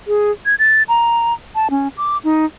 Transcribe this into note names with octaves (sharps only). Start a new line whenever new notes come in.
G#4
G#6
A6
A#5
A5
C#4
D6
D#4